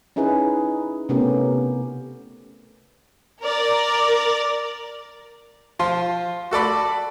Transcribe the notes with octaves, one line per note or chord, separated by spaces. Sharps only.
C#4 D#4 E4 G#4 B4
C3 A3 B3 C#4 G4 A#4
A#4 D5
F3 F4 C6
F#4 A4 D5 B5